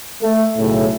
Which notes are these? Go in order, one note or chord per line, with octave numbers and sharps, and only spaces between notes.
A3
B1 A2 C#3